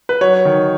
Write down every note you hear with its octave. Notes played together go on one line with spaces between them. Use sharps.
B4
F#3 C#5
D#3